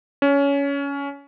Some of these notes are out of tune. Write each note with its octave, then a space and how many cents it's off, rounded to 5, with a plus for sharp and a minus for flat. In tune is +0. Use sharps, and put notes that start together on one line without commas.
C#4 +20